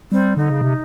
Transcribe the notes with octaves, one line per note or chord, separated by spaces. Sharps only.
G3 C4
D3 D#4
C#3
C3